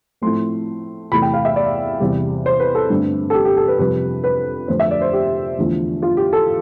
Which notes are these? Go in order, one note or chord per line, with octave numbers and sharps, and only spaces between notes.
A2 F3 A3 C4 C6
E2 C3 E3 A3 B5
G5
F5
E5
D5
E2 C3 G3
C5
B4
A4
G2 D3 A3 C4
A4
G4
G4
A4
B4
F2 C3 G3 B4
B4
F2 D3 A3 D4 C5
E5
D5
C5
G4
E2 D3 F3 A3
F4
G4
A4